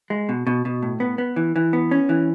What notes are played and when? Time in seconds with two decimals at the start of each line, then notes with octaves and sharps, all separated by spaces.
0.10 G#3
0.29 B2
0.47 B2
0.65 B2
0.82 A2
1.00 B3
1.18 B3
1.36 E3
1.56 E3
1.73 B3
1.91 C#4
2.09 E3